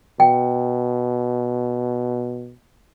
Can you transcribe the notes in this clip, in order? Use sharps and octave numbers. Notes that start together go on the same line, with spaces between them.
B2 G5